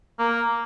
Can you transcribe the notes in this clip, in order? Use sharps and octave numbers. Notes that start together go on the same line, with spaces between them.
A#3